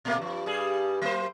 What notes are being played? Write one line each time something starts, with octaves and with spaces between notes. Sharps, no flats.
A#2 A3 A#3
G2 F3
G2 G3 G#4
F#3 A#3 C5